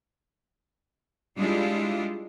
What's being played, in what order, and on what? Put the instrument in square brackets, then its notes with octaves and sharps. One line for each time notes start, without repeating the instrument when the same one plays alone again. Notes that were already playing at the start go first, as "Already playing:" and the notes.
[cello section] G3 G#3 D4 E4 F4